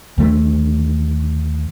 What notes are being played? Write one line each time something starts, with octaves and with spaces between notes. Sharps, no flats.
D#2 D3 A3